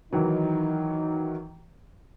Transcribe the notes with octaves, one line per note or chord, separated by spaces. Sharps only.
D#3 E3 F#3 D#4